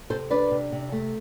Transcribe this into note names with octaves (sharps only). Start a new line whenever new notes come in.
C3 A4 C5
D4 B4 D5
C3
C3
A3